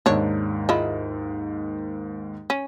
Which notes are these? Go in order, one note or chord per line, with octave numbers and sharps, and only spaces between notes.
D#2 G#2 D4 C#5
G#3 E4 F4
C#4